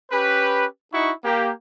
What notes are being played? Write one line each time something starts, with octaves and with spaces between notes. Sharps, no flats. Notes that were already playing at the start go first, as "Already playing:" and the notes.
C#4 G4 B4
D#4 E4 F#4 C#6
A#3 G4